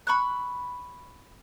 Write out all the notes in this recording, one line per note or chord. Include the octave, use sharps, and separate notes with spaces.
B5 C#6 E6 F#6